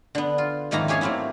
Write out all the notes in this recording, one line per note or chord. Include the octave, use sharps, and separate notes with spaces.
D3 B3
F4
F2 G#2 D#3 A#3 E4 A#5
C#4 G4 G#4 C#5 G#5 A5
F#3 A3 A#3 C4 E4